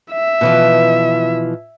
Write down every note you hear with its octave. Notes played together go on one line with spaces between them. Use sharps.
E5
B2 E3 F3